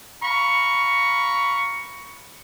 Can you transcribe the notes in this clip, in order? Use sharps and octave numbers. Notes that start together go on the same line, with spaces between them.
F5 A#5 B5 C#6